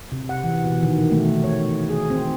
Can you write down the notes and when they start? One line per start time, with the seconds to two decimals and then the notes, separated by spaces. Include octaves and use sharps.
0.12 C3
0.29 F#5
0.44 E3
0.64 B2
0.83 D#3
0.98 B2
1.12 A3
1.44 C#5
1.90 G#4
2.10 C4